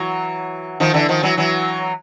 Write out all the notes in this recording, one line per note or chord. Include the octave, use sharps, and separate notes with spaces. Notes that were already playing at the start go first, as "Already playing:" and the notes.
Already playing: E3 F#3
D#3 F3
D3 E3
D#3 F3
E3 F#3
E3 F#3